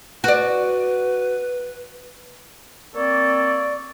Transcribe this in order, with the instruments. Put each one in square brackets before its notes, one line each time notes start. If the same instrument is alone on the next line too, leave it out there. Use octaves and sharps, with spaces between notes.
[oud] F#4 D5 [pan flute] B4
[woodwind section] A#3 C4 A4 C#5 D5